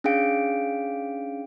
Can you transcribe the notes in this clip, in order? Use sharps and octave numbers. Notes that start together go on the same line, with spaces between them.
C#4 D4 G#4 F5 G5 D7